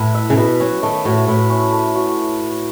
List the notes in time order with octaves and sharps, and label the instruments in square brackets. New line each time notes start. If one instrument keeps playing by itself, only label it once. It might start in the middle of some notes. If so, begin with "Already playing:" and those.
Already playing: [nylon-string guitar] A2 [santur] E4 B4
[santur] E5
[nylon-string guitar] C#3
[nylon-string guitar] B2 [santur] B4
[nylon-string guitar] F#3 [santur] C#4
[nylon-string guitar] D#3 [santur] A3
[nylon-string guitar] A2 [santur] F#4
[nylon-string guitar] A2 [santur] B4
[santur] C#4
A3
F#4